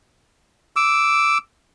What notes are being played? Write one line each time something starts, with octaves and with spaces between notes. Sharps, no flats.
D6 E6